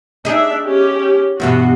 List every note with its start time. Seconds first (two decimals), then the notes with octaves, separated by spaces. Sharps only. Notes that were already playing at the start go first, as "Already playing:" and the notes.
0.25 D4 D#4 G#4 E5
0.67 C#4 G4
1.40 E2 G2 B2 F#4